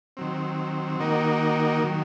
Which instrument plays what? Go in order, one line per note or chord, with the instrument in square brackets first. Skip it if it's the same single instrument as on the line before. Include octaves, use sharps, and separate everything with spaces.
[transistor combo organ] D#3 F#3 C4
D#3 A#3 D#4 F#4 A#4
D#3 F#3